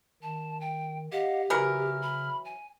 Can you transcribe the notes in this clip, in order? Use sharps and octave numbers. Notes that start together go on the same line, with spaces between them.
D#3 A5
G5
G4 D#5 F5 F#5
C#3 E3 F#3 A#4 F6
B5
G#5